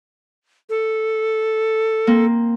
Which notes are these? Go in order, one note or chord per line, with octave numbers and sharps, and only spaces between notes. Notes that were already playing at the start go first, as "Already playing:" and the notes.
A4
A#3 C4